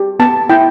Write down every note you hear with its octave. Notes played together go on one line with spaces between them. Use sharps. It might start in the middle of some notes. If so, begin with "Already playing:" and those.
Already playing: G4
B3 A5
E4 G5